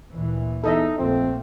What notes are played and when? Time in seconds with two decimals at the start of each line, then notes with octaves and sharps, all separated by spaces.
0.11 D2 A#2 E3
0.64 E2 D#4 A4 D#5 E5
0.98 A#1 F2 A3 A#3 C4